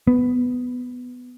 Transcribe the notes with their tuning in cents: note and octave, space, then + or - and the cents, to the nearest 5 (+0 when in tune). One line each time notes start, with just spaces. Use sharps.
B3 +10